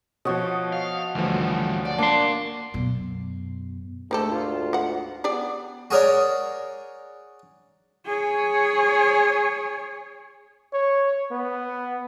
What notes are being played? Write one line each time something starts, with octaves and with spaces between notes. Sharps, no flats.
B2 F3 F#4 C#5 D#5
F5
D2 E3 F3 G3
D5 F#5
A#3 D4 C6
F#2 B2
D2 G#2 A3 A#3 G4 A4
F4
F#4 F#5
B3 G4 G#4 D5
F#4 G#4 A#4 C#5 D5
G#4 C#5
C#5
B3